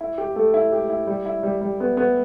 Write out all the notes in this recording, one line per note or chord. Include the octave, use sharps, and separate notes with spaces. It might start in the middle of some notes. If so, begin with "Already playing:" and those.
E4
G4
A3
E4
G4
E4
G3
E4
G3
G3
B3
B3